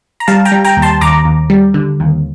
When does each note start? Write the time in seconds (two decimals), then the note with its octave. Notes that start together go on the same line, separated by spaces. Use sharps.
0.20 A#5
0.28 G3 F5 A5
0.45 G5 A#5
0.52 G3
0.65 G5 A#5
0.77 D#2
0.82 A5 C6
1.01 D#2 A#5 D6
1.25 D#2
1.50 G3
1.74 D3
2.00 D#2